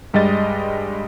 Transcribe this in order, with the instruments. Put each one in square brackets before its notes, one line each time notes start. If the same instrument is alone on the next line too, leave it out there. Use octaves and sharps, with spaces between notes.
[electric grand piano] G2 G3 G#3 D#5 A6